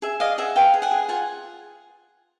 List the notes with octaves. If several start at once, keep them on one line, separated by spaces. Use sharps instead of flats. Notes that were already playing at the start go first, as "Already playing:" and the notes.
G#4 E5
D5 D#5 F5
G#4 E5 F#5
B4 F5 G5
G#4
F#5 G#5
G#4
F4 F#5 G#5